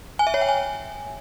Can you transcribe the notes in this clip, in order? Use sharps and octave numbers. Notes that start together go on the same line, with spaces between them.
G#5
E5
C#5
G5
G#5